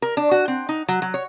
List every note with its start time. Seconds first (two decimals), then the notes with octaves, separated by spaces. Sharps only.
0.02 A#4
0.17 D4
0.31 F#4
0.48 C4
0.69 D#4
0.88 F#3
1.02 F#3
1.14 C#5